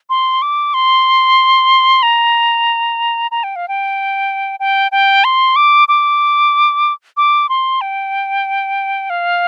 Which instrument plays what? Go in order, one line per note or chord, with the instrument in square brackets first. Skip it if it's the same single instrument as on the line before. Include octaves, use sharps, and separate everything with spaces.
[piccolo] C6
D6
C6
A#5
A#5
G5
F5
G5
G5
G5
C6
D6
D6
D6
C6
G5
F5